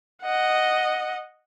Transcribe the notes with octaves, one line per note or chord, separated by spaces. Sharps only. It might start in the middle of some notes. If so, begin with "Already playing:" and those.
D#5 F#5